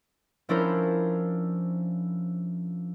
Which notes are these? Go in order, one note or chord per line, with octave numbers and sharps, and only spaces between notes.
F3 C#4 D4 E4 A#4 C5